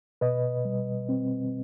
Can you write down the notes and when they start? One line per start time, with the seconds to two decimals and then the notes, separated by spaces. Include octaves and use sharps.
0.21 B2 B4 D#5
0.65 G3
1.09 C4